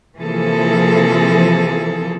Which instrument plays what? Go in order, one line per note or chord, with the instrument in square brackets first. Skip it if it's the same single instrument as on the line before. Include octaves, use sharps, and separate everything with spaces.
[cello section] C3 E3 F3 A#3 G#4 A4